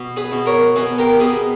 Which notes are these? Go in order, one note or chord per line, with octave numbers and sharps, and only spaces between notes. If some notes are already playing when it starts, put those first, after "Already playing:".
Already playing: B2
G#4 B4
B2
A#4 C#5
B2 G#4 B4
G4 A#4
B2 G#4 B4